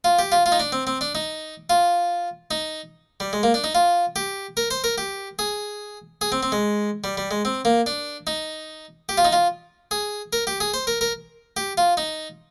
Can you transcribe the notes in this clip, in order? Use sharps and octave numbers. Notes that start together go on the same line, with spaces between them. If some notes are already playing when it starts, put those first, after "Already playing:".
F4
G4
F4
F4
D#4
D4
C4
C4
D4
D#4
F4
D#4
G3
G#3
A#3
D4
D#4
F4
G4
A#4
C5
A#4
G4
G#4
G#4
C4
C4
G#3
G3
G3
G#3
C4
A#3
D4
D#4
G4
F4
D#4
F4
G#4
A#4
G4
G#4
C5
A#4
A#4
G4
F4
D#4